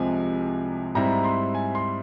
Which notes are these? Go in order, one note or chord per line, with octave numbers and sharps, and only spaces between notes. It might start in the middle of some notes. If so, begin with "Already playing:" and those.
Already playing: C2 C3 F3 G#3 G#5
G#2 G3 C4 E4 A#5
C6
G#5
C6